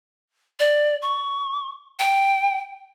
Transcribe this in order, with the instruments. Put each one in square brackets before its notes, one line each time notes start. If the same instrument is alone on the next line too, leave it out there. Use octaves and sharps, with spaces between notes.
[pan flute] D5
C#6
G5